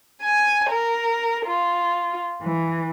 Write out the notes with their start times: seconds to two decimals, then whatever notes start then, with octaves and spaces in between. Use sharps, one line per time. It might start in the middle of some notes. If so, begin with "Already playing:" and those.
0.22 G#5
0.68 A#4
1.45 F4
2.41 E3